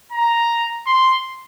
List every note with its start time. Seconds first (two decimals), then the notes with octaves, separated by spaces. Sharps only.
0.13 A#5
0.87 C6